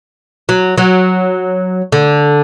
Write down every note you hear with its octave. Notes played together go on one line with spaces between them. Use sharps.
F#3
F#3
D3